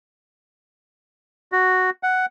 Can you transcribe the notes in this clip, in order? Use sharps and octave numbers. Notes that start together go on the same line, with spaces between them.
F#4
F#5